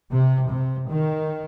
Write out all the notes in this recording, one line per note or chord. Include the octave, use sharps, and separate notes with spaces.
C3
C3
D#3